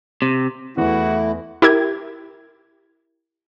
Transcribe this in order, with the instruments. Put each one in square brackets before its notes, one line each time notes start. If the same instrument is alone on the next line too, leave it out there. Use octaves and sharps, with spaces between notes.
[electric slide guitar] C3
[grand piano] E2 [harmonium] A3 E4 [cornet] F#4
[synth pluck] E4 G4 A#4 G#6